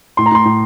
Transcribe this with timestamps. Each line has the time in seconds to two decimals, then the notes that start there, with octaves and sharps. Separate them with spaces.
0.17 A2 C6
0.26 A#5
0.32 A2 C6
0.45 A2